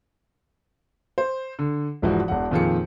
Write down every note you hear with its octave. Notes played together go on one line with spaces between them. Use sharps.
C5
D3
E1 G#2 E3 F3 F#4
E1 E2 F#5
F2 A#2 D#3 F4 G#4 C#7